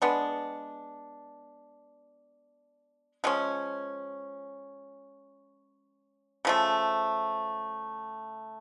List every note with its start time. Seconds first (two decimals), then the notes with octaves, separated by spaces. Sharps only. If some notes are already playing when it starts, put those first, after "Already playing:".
0.02 G#3 B3 D4
3.24 F3 G#3 C#4
6.45 C#3 F3 A3